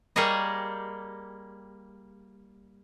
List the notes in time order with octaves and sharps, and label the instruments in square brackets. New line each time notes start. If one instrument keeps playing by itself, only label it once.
[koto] G3 A#3 G#4 C#5 D#5